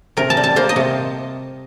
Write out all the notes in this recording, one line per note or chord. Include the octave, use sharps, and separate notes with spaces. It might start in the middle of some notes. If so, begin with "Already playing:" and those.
C3 A#4
A5
G3
A5
A#3 C5
D#5
C3